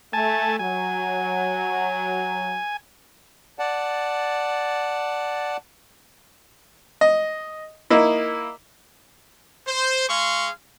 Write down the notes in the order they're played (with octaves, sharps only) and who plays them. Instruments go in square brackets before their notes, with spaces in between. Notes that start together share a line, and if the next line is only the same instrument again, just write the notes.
[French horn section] A3 [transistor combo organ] G#5 A5
[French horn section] F#3 [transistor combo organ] G#5
[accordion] D5 F#5 A5
[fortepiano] D#5
A#3 D#4 E4
[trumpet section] C5
G#3 G#4 F5 C6 C#6